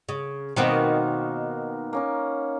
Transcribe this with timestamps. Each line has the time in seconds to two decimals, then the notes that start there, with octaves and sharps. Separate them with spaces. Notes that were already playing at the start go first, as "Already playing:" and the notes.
0.09 C#3
0.56 B2 D#3 A#3 C4 F#5 C6
1.93 A#3 C#4 D#4